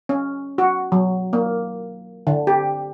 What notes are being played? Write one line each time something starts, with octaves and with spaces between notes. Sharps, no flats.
C#4
F#4
F#3
A#3
D3
G4